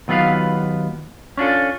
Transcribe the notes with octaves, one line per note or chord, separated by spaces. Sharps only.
D#2 F#3 B3 F4 B4 F5
C#4 D4 F4 A4